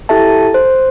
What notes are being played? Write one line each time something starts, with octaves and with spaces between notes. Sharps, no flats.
E4 G4 A4 E5 A5
C5